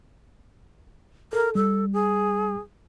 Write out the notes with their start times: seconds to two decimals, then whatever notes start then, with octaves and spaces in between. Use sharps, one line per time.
1.33 A4 A#4
1.55 G3 A4
1.93 G#4